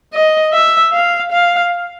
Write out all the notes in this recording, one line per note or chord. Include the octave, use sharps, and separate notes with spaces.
D#5
E5
F5
F5